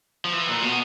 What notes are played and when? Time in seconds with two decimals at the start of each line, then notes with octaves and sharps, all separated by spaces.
0.25 F3
0.33 E3
0.48 A#2
0.62 B2